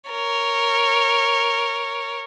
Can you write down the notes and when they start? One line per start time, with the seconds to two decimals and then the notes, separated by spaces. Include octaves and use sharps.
0.10 A#4 C#5